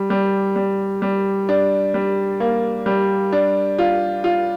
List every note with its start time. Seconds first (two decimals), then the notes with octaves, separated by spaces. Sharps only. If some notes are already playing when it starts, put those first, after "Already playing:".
Already playing: G3
0.10 G3
0.56 G3
1.02 G3
1.49 D4
1.94 G3
2.40 A#3
2.86 G3
3.33 D4
3.79 F4
4.24 F4